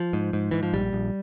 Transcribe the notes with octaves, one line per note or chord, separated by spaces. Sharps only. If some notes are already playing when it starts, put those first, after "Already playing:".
Already playing: F3
G#2
G#2
G#2 E3
F3
A#1 G3
A#1